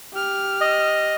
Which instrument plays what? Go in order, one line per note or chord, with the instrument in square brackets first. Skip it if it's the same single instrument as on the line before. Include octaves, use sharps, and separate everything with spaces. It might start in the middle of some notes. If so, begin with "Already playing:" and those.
[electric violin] G4 F6
[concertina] D#5